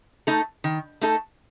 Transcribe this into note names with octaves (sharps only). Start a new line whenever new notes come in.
A3 D#4 A4
D#3
A3 D#4 A4